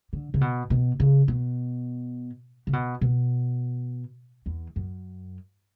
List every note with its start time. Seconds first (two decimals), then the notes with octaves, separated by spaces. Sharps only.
0.13 D3
0.34 C#3
0.41 B2
0.70 B2
1.00 C#3
1.28 B2
2.67 C#3
2.73 B2
3.01 B2
4.46 E2
4.76 F#2